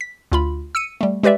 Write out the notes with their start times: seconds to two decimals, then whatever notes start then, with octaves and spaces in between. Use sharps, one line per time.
0.01 B6
0.32 D2 F4 B5
0.75 E6 C#7 D#7
1.01 G3 A3
1.23 G#3 G4 B4 D5 E5